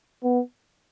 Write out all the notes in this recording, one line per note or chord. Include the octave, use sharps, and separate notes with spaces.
B3